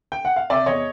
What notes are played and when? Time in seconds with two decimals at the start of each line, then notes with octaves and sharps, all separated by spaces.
0.12 G5
0.25 F#5
0.36 F5
0.50 C3 D5 E5
0.66 E2 C#5 D#5